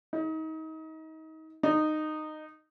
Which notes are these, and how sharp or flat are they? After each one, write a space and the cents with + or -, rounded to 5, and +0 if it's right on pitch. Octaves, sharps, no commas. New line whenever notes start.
D#4 +30
D#4 -15